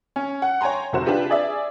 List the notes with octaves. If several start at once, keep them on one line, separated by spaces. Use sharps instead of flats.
C#4
F#5
C#5 G5 G#5 A#5 C6
F1 C3 F#4 C5 E7
D4 F4 G4 B4
G#4 D5 E5